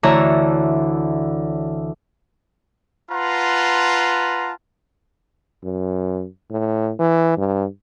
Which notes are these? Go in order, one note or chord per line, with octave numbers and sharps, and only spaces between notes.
D2 D3 E3 C#5 A#5 E6
F4 B4 F#5 A5 A#5 C6
F#2
A2
E3
G2